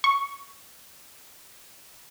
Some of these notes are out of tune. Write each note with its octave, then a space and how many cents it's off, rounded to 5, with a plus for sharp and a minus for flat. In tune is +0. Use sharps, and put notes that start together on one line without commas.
C#6 +5